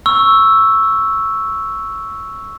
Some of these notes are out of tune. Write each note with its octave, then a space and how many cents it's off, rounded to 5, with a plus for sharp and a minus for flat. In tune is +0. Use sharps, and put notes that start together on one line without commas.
C#6 +0 E6 +0